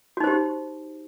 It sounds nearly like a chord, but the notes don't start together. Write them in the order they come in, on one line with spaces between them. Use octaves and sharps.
F#4 D#4 C5 G4